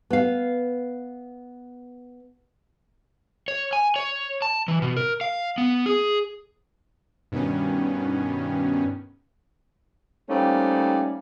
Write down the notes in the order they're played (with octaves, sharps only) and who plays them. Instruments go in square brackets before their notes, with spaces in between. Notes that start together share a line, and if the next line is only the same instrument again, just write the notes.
[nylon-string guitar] B3 F5
[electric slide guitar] C#5
G#5
C#5
A5
E3
B2
A#4
F5
B3
G#4
[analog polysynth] G2 B2 D#3 C#4
[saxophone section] G3 A3 A#3 C4 C#4 D#4